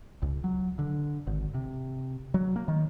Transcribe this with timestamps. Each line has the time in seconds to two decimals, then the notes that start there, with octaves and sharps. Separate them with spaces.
0.22 C#2
0.44 F#3
0.79 D3
1.27 G#1
1.54 C3
2.34 F#3
2.56 A#3
2.68 D#3